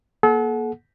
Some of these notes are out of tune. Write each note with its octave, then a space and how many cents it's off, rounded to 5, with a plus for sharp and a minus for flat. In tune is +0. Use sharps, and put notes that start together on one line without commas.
A#3 +25 A4 -40 F#5 -10